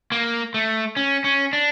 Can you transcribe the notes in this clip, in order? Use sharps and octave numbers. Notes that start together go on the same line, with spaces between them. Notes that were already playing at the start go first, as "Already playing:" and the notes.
A#3
A3
C#4
C#4
D4